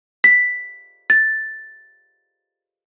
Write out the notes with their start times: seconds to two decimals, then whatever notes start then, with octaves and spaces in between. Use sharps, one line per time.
0.24 B6
1.10 A6